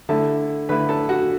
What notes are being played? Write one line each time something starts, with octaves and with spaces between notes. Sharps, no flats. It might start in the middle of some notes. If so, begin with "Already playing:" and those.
D3 A3 E4 A4 A5
D3 A3 E4 B4 B5
A4 A5
F#4 F#5